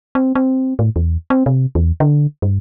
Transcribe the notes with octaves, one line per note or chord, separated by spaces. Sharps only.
C4
C4
A2
E2
C4
C3
E2
D3
G2